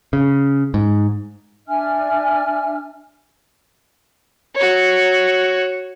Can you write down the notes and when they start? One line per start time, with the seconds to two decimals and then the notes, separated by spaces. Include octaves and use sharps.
0.13 C#3
0.74 G#2
1.67 D4 E5 G#5 F6
4.55 F#4 C#5